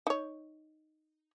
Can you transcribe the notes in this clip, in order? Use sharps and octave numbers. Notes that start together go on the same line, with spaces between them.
D#4 C#5